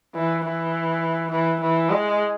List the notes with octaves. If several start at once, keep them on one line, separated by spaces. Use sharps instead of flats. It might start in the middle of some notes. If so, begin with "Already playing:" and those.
E3
E3
E3
E3
G#3